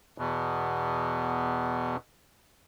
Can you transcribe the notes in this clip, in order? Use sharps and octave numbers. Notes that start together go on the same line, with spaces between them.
E2 B2